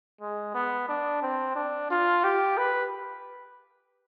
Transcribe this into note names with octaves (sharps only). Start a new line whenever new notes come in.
G#3
B3
D4
C4
D4
F4
G4
B4